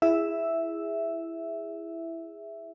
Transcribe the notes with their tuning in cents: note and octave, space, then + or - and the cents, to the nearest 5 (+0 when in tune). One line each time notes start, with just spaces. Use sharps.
E4 +10 G#4 -15 E5 +0